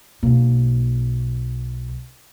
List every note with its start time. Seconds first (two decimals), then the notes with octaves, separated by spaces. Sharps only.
0.23 B1 A#3